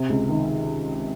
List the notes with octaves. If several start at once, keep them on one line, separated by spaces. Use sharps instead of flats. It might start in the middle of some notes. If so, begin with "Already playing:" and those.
Already playing: C3
C#2
D#3